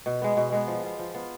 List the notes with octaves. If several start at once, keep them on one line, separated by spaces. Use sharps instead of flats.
B2
G#3 B3
B2
G#3 B3
F3
B3 F4
F3
B3 F4